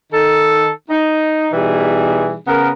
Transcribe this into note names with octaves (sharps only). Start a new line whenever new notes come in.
D#3 D#4 A4
D#4
B2 E3 G3 D#4 G#4
C#3 B3 A#4